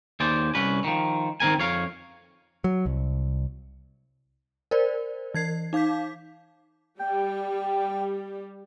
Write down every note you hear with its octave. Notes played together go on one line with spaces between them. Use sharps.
D#2 G#4 C5 D5
C2 C#4 B4
D#3 F3
D#3 C4 A#4 G#5
F2 C#5 F5
F#3
C2
A#4 C5 D5
E3 G#6 C7
D#4 F5 D6 G6 B6
G3 G5